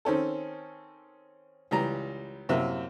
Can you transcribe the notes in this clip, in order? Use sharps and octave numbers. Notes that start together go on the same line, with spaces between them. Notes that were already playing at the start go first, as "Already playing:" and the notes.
D#3 C4 C#4 A4
C#2 E3 G3 A#5
F#2 A2 C3 A#3